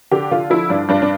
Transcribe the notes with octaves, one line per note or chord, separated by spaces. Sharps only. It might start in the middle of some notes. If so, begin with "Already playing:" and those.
D3 G4
D3 F4
F3 E4
G2 D4
G2 D4
D4